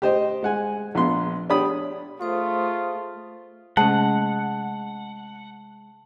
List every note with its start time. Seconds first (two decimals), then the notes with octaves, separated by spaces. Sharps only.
0.02 G4 C5 D#5
0.43 G#3 F#5 G#5
0.95 A#1 B3 C6
1.50 D4 G4 C#5 B5 D#6
2.21 A3 F4 G#4 C5 D#6
3.77 C3 G#3 A3 C#4 F#5 A5